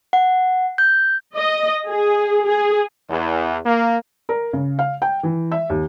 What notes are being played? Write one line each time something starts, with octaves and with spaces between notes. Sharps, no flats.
F#5
G6
D#5
G#4
G#4
E2
A#3
A#4
C#3
F5
G5
E3
E5
D#2